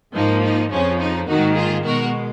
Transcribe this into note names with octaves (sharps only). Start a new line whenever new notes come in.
G#2 F3 A#3 D#4
D#4
F2 C#3 F3 C#4
D#4
G#2 D#3 A#3 D#4 F#4
F4 G#4
B2 G#3 F#4 A#4